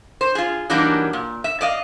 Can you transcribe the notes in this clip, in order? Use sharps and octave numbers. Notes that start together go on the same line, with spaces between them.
C5
F4 G#4
E3 F#3 G3 A#3 D4 D#4
A#2
E5
D5 D#5 F5